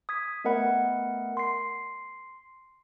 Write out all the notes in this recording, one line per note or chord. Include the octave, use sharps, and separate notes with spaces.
D#6 G#6 B6
A3 B3 A#4 D#5 F#5 B5
C6 C7